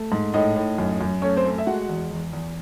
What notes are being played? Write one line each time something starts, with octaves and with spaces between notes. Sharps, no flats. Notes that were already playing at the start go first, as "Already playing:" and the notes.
Already playing: A3
G#2
A2 D#4 D#5
A2
F#2
F#2
A3 C#4 C#5
C4 C5
A3
E5
G#3 F#4 F#5
E2
E2
E2